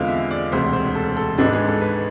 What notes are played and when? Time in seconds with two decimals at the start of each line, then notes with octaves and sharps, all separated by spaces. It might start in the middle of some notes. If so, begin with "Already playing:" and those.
Already playing: E2 D3 F3 G#3 C4 F5
0.08 E5
0.31 D5
0.52 E1 D2 C3 C5
0.73 C5
0.95 A4
1.17 A4
1.38 G#1 G#2 G#3 B3 D4 A4
1.53 G#4
1.68 A4
1.81 B4